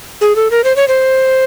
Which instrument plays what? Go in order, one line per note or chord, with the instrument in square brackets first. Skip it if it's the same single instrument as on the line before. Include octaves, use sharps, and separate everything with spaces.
[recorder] G#4
A4
A#4
C5
C#5
C5